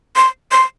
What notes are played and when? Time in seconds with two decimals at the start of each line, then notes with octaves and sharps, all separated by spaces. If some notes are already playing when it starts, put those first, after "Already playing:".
0.16 C6
0.52 C6